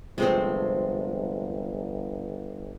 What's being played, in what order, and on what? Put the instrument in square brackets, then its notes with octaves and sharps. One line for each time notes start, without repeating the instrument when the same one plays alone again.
[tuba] G1 [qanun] C3 F3 A3 [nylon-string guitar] G#3 C4